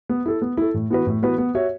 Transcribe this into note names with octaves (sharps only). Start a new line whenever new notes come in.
B3
E4 A4
B3
E4 A4
A2
E3 B3 F#4 B4
A2
E3 B3 F#4 B4
B3
F#4 C#5 E5